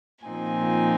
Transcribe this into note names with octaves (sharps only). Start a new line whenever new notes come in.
A#2 F3 C4 D#4 G#5